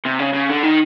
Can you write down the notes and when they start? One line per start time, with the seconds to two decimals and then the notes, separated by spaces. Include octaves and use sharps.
0.05 C3
0.19 C#3
0.34 C#3
0.49 D3
0.63 D#3